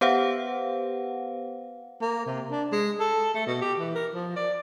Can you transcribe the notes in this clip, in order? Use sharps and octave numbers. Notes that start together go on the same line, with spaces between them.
B3 G4 B4 C5 F5 F#5
A#3
C3
D4
G#3
A4
A3
B2
G4
E3
A#4
F3
D5